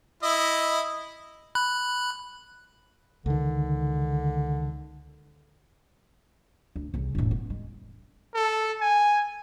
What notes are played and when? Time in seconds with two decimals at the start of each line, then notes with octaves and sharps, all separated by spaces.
0.23 E4 D#5
1.55 B5 F#6
3.26 C#2 D3 D#3
6.76 D2
6.94 C2 C#3
7.15 E1 A2
7.31 B3
7.50 G#3
8.34 A4
8.81 G#5